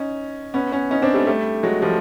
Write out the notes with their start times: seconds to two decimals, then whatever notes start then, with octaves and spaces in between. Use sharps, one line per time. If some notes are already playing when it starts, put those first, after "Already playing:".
Already playing: C#4 D#4
0.54 B3 C#4
0.72 B3 C#4
0.91 C#4 D#4
1.02 C4 D4
1.14 G3 A3
1.27 G3 A3
1.63 F#3 G#3
1.82 F3 G3